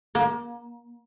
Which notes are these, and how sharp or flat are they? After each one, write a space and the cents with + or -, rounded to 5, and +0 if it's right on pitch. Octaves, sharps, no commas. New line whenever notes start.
A#3 +30